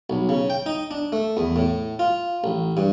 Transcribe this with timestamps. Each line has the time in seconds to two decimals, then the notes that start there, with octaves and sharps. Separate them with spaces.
0.10 B1
0.29 C#3
0.50 G5
0.66 D#4
0.91 D4
1.12 A3
1.37 E2
1.56 A2
1.99 F4
2.44 A1
2.77 G2